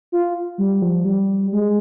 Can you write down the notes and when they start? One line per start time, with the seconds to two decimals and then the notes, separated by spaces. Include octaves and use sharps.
0.12 F4
0.58 G3
0.82 F3
1.05 G3
1.52 G#3